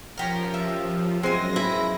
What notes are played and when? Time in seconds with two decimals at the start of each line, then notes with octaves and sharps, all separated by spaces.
0.17 F3 C#4 G4 A#4
0.54 E5
1.23 F#2 G#3 C4 G#5 A#6
1.56 E4 E5